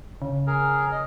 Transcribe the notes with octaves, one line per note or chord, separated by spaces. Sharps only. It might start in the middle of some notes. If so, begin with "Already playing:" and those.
C#3
G#4 A#4
D#5